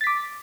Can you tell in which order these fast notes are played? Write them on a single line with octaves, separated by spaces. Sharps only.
A6 B6 D6